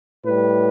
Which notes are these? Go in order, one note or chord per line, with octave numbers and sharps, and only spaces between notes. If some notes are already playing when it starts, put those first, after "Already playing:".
A2 G3 B4